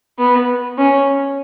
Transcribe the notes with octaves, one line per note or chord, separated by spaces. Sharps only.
B3
C#4